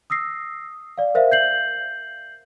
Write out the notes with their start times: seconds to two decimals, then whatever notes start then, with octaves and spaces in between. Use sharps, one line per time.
0.10 D#6 E6 A#6 C7
0.98 D5 F5
1.15 A#4 C5 E5 F5
1.32 G6 C7 F#7